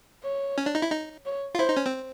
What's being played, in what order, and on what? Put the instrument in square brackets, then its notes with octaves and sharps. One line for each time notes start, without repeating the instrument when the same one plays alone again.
[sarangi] C#5
[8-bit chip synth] C#4
D4
D#4
E4
D#4
[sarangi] C#5
[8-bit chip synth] F4
[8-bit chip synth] E4 [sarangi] C5
[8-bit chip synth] D#4
C#4
C4